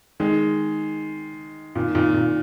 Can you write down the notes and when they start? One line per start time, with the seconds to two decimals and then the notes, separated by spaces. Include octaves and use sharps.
0.20 D#3 G#3
1.75 A#2 D#3
1.95 A#2 D#3
2.14 A#2